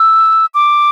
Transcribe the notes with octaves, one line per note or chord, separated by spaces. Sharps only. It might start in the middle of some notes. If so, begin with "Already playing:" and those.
Already playing: E6
D6